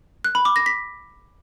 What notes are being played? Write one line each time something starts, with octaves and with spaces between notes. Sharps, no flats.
F#6
B5
D6
A#6
B6